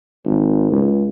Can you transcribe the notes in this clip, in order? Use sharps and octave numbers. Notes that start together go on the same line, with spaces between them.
G#1
C#2